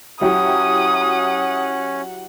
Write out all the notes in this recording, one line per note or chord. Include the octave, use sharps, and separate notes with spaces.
F#3 C#4 E4 G4 F#5 D#6